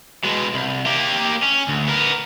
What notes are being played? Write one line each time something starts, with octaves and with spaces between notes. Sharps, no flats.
B2 G#3
C2
A#3 G4
C#4
D2
B3 A#4